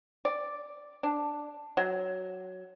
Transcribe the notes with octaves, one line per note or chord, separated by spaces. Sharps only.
D5
D4
F#3